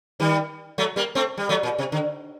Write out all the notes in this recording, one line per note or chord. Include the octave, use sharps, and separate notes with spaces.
D#3 G3
F#3 A3
G3 A#3
A3 C4
G3
F#3 A3
A#2
C3
D3